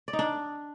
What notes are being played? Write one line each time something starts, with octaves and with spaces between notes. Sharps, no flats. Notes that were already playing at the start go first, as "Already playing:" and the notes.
D5
D#4
D4